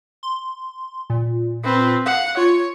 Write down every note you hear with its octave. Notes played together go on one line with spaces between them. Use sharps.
C6
A#2
C4 B4
F5 F#5
F4 C#5